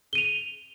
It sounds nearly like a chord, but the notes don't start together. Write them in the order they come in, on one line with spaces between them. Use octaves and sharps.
G7 D#7 F7